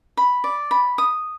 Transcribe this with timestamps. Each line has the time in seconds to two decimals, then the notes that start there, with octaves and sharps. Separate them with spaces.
0.17 B5
0.44 D5
0.71 B5
0.98 D#6